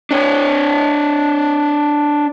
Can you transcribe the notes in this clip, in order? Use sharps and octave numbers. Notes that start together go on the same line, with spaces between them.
D4 C#5